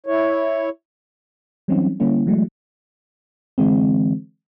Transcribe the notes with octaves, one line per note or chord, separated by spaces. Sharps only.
E4 C#5
E3 F#3 G3 C4 C#4 D#4
D3 G3 A#3 C#4 E4
E3 F#3 G#3 A3
D3 E3 G#3 C4